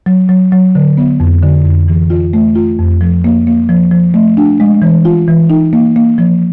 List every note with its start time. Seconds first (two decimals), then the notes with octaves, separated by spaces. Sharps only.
0.06 F#3
0.29 F#3
0.52 F#3
0.75 D3
0.97 B3
1.20 F2
1.43 D3
1.65 F2
1.88 E3
2.10 F4
2.33 A3
2.56 F4
2.79 F2
3.01 F3
3.24 A#3
3.47 A#3
3.69 F3
3.91 F3
4.14 A3
4.37 D4
4.60 G#3
4.82 E3
5.05 F4
5.28 E3
5.50 D#4
5.73 A#3
5.96 A#3
6.18 F3